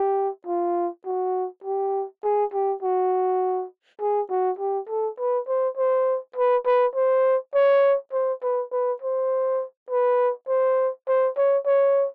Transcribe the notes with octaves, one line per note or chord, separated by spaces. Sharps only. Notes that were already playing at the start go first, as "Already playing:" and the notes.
Already playing: G4
F4
F#4
G4
G#4
G4
F#4
G#4
F#4
G4
A4
B4
C5
C5
B4
B4
C5
C#5
C5
B4
B4
C5
B4
C5
C5
C#5
C#5